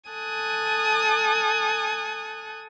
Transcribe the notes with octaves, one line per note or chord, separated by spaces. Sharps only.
A4 G#5 D#6 F#6